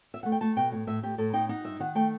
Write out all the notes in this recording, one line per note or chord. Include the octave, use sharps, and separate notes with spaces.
E5
A3 F#5
G5
A3 A5
B2 G5
A2
A2 E5
A2 G4
A2 A4
D#4 G5
D#4 F#5
G2 E5
D#3 F#5
A3 G5